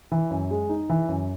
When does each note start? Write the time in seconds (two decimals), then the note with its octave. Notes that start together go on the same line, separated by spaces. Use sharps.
0.12 E3
0.30 F#2
0.51 G#3
0.69 D#4
0.90 E3
1.08 F#2